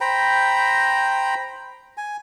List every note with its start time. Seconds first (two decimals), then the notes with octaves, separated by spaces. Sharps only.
0.01 C5 G5 A#5 B5
1.97 G#5